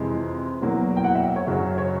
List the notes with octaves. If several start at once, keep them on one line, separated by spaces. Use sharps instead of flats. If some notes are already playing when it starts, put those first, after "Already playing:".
Already playing: F2 C3 E3 G#3
E2 B2 F#3 A#3
G5
F#5
E5
C#5
F#2 C#3 F#3
C#5